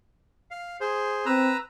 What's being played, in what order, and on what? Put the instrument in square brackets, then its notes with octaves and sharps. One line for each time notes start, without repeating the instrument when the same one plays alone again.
[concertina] F5
G#4 C5
[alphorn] C4 [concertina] B4 A#5 E6